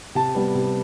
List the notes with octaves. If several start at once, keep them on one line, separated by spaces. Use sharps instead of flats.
C3 A5
G3 B3
C3